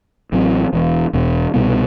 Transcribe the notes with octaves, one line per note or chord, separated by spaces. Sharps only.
A1 A2 F#3 C4
E1 E2 B2
E1 E2 B2
C2 B2 G3 B3